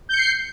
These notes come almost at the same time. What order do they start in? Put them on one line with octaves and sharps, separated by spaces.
G6 C#7 C7